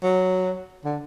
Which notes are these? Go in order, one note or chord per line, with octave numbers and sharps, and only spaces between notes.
F#3
D3